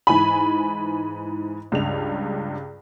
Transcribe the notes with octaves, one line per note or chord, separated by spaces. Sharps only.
G#2 E3 G#5 B5
C#2 G2 F7